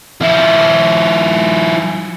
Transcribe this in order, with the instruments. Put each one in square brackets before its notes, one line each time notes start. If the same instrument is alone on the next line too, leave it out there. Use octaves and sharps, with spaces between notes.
[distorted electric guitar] F3 E4